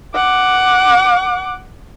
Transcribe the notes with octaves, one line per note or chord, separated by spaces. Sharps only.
F#5 D6